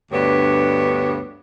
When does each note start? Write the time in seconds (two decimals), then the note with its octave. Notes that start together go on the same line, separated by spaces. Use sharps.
0.12 D2 G2 B3 D4 C#5